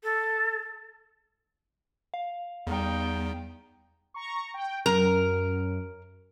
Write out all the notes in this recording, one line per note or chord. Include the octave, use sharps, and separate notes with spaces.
A4
F5
E2 G3 B3 D#4 G5
A#5 C#6
G5
F#2 A#4